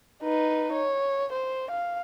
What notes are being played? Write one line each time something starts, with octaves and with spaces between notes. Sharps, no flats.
D#4 B4
C#5
C5
F5